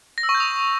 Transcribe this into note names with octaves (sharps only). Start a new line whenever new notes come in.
A#6
E6
C#6
G6
D#6